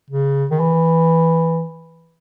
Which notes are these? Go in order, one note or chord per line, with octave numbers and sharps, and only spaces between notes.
C#3
D#3
E3